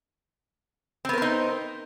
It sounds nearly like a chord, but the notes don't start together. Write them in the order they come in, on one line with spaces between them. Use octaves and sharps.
C4 B3 A#4 C5 D#4